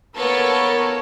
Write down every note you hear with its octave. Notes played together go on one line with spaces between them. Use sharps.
A#3 B3 A4 A#4 C#5